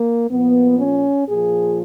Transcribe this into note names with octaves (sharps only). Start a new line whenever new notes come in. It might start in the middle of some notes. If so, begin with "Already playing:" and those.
Already playing: A#3
A#2 F3 B3
C#4
A#2 F3 G#4